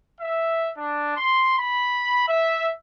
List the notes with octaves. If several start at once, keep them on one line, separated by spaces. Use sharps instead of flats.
E5
D4
C6
B5
E5